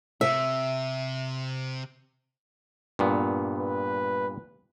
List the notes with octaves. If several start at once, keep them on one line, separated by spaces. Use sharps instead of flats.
C3 E5
G2 A#2 B3
B4